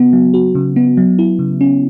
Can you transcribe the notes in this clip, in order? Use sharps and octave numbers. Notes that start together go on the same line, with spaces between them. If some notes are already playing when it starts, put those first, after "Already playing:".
Already playing: C#3 B3 F#4
F#3
F#4
C#3
B3
F#3
E4
C#3
C#4